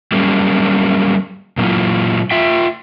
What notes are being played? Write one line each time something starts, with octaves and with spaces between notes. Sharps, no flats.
F#3 G3 A#3 C#4 G#4
A#2 F#3 A3 A#3 E4 F4
F4 E5 G5